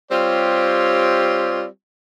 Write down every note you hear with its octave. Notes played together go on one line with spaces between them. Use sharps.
G3 C4 F4 G4 C#5